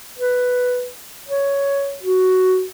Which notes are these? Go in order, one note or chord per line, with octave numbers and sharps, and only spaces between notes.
B4
C#5
F#4